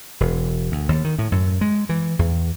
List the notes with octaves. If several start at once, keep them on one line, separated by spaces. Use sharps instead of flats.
E1
D2
D#2
D#3
A2
F#2
G#3
E3
E2